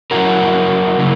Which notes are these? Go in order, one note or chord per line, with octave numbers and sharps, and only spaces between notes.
F#3 C#4 E4 F#4 A#4
C#3 F#3 A#3 E4